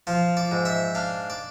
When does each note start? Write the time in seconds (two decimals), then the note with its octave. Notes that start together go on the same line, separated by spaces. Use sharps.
0.07 F3 F4
0.37 D5
0.51 G#2
0.65 E5
0.95 D4 F5
1.30 D5